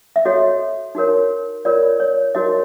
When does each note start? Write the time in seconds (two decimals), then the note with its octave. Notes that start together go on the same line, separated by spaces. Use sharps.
0.16 E5
0.25 F#4 A4 C#5 D#5
0.95 D#4 F#4 A#4 C#5
1.65 F4 A#4 C#5 D5
2.00 C#5
2.35 D#4 F#4 A#4 C#5 D#5